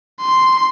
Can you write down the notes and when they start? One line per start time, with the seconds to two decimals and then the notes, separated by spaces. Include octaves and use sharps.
0.21 C6